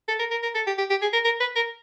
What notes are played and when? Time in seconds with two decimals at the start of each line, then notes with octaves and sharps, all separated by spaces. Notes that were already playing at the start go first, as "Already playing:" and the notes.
0.08 A4
0.19 A#4
0.31 A#4
0.43 A#4
0.55 A4
0.67 G4
0.78 G4
0.90 G4
1.02 G#4
1.13 A#4
1.25 A#4
1.40 B4
1.56 A#4